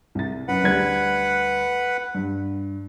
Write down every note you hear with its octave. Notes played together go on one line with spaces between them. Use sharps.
C2 A6
F#2 B4 F#5
D2 G3 G#6
G2